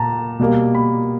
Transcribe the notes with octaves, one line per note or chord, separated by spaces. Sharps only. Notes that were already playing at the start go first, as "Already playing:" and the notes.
Already playing: A#2 A5 A#5
B2 G3 A#3
B5